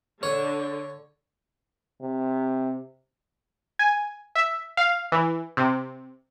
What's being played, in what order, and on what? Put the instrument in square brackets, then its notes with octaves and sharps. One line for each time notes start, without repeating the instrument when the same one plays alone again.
[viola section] D3 [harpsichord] C#5
[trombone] C3
[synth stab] G#5
E5
F5
E3
C3